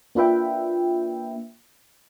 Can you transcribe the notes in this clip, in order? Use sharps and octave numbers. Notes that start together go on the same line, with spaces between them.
A#3 D4 F4 B4 E5 G5